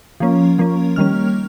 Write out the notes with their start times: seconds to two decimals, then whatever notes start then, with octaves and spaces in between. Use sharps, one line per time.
0.20 F3 A#3 C#4
0.58 F3 A#3 C#4
0.96 D#3 G3 A#3 C#4 F6